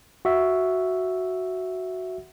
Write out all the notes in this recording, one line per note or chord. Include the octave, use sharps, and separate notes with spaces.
F#4 E5